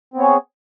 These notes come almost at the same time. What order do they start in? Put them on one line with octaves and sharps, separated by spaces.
C4 B3 C#5 G#4